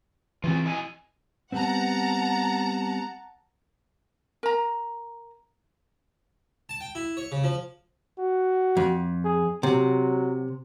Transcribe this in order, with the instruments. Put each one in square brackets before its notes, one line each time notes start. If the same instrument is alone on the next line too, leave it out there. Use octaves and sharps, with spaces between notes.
[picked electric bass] E3 C4 [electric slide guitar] F4 G#4
[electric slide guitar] E4 D#5 G#5
[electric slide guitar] G3 B3 C4 [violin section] F#5 A5 A#5
[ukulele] A#4 A#5
[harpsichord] A5
G5
E4
C#5
C#3
F3
[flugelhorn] F#4
[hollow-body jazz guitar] F2
[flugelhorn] G#4
[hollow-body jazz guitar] C3 [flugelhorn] F#3